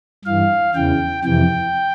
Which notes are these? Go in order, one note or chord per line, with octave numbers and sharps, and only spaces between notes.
G2 E3 F5
E2 C#3 E3 G5
F2 C3 E3 G5